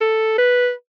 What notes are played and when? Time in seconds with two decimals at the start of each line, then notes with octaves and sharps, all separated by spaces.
0.01 A4
0.38 B4